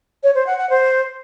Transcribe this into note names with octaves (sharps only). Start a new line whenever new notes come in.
C#5
C5
F#5
F#5
C5